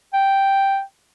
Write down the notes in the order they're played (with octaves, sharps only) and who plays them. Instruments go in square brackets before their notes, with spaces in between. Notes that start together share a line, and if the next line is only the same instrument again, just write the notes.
[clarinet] G5